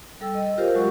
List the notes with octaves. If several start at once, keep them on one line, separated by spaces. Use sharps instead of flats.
G3 A4 G5 E6
D#5
F4 G4 A#4 C5 F5
F#3 G#3 F#4 C#6